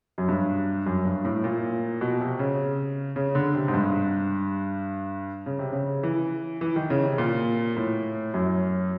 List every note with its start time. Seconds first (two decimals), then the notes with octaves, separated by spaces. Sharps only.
0.18 F#2
0.28 G2
0.86 F#2
1.05 G2
1.25 A2
1.44 A#2
2.01 B2
2.20 C3
2.39 C#3
3.16 C#3
3.35 D3
3.55 C3
3.68 G#2
3.74 G2
5.46 C#3
5.59 C3
5.72 C#3
6.03 E3
6.61 E3
6.76 D#3
6.90 C#3
7.04 C3
7.18 A#2
7.77 A2
8.34 F#2